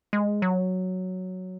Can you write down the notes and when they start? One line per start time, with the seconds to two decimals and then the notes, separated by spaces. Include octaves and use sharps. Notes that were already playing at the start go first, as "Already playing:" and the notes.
0.13 G#3
0.42 F#3